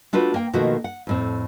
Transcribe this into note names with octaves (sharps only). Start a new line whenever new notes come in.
A3 D4 F4 F#4 B4
A#3 G5
B2 D#3 F3 A3 A#3 F#4
F#5
F2 A2 C4